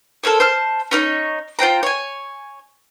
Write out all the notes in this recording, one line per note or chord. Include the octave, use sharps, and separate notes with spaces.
A4 A#4 C5 C#5
C5 A5 F6
C#4 D#4 A#4 C#5
F4 C5 G5 A#5
C#5 G#5